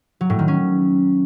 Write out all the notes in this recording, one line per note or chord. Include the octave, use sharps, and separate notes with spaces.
F#3
A2
D#3
C#4